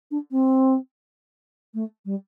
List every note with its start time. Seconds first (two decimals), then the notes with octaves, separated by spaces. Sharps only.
0.11 D4
0.31 C4
1.74 A3
2.06 G3